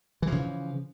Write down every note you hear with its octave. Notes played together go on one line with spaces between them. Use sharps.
C#3 E3 F3